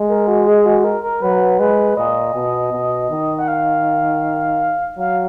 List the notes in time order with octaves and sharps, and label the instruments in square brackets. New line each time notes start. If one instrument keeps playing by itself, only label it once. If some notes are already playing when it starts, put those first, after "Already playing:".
Already playing: [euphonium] G#3
[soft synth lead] A#4
F#4
G#4
F#4
A#4
A#4
[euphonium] F#3 [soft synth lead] B4
[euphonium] G#3 [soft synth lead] B4
[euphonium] A#2 [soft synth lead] D#5
[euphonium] B2
B2
D#3
[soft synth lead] F#5
F5
[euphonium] F#3 [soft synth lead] F5